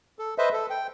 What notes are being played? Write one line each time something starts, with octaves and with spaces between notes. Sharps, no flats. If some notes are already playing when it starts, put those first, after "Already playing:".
A4
B4 C5 D#5 E5
A4
G5